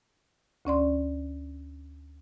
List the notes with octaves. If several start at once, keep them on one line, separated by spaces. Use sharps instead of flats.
D2 C#4 D5 C6